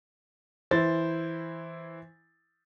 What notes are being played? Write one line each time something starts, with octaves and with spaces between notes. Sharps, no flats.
E3 E4 C5 A6